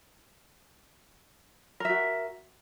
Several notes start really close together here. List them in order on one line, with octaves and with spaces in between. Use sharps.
A#4 E5 F#4